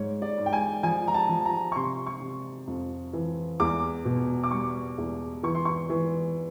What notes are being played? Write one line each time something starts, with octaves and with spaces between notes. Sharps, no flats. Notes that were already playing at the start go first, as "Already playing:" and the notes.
Already playing: G#2 C#5
D5
G#2
G5
G#5
F3 G#5
A#5
A5
F3
A#5
C#6
C3 C6
C#6
C3
F2
E3
E2 D6
B2
D6
G3 C#6
E2
E3 C#6
C6
C#6
E3